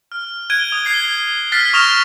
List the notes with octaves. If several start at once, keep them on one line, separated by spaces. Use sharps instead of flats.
F6
F#6 G#6 D7 D#7 G7
D#6
G#6 C7 G7
F6 F#6 A6 B6 C7
C#6 D#6 F6 A#6 E7 F7